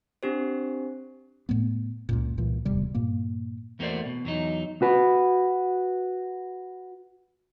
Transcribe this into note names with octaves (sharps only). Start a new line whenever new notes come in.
C4 D4 G4 C5
A2 A3 B3
C#2 F#2 A#2
C2 A#2 E3
D1 E2 C3 G3
G2 A#2 A#3
E2 A3 A#3 F#4 C5 D5
B2
E2 F#3 D#4
F#4 B4